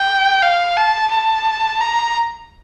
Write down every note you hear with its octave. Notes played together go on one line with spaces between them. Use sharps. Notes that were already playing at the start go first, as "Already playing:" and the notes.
Already playing: G5
F5
A5
A5
A#5